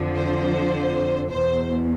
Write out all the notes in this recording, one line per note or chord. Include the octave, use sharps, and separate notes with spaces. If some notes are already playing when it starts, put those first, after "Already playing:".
Already playing: F2 D3 F3
C5
E2 B2 C5